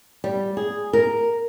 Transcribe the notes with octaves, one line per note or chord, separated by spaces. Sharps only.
G3
G#4
A#4